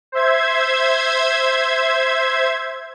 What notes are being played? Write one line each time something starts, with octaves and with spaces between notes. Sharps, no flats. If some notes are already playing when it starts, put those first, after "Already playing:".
C5 E5 G#6